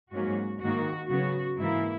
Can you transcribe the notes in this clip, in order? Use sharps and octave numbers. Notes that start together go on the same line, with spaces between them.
G#2 F#3 A#3 C#4 F#4
G#2 D#3 A#3 F#4
C#3 F#3 B3 F#4
G#2 E3 A#3 E4